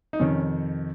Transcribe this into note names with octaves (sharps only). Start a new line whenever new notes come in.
D#4
F2 C3 D#3 C#4